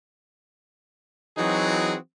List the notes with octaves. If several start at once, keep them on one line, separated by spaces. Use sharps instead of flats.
E3 F#3 C4 D#4 F#4 G#4